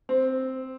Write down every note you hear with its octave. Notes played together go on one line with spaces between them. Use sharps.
C4